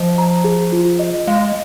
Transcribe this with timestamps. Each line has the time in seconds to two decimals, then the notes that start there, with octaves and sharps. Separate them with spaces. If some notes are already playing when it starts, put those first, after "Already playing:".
Already playing: F3 D#5
0.18 A#5
0.44 G#4
0.72 F4
0.99 D#5
1.27 G#3 F5